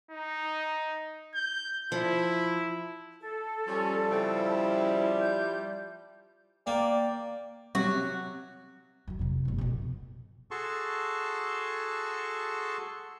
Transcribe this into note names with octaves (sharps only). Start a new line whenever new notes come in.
D#4
G6
F3 E4
A4
F3 G3 C#4
C#3 C4 E4
G6
A#3 D5 G5
C3 F#3 F#4
F#2 D3
F2 C3
D1 G1
F2 B2
F#4 G#4 A4 A5 C6 C#6